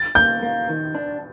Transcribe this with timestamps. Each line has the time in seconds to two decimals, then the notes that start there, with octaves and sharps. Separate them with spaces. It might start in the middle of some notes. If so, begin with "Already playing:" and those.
Already playing: A6
0.15 A#3 G6
0.43 A#3
0.69 D#3
0.95 D4